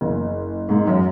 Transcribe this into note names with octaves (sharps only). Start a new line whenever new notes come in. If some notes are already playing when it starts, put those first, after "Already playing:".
F#1
G#2
F#2